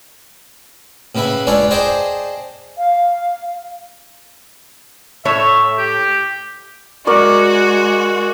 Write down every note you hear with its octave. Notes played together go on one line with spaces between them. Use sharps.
A2 C#3 B4 E5 B5
G#3 D4 F4 B4 C#5 D5
G#4 C5 D5 D#5 G5 A5
F5
A2 A3 C#5 E5
G4
G#3 F#4 A#4 D5 C#6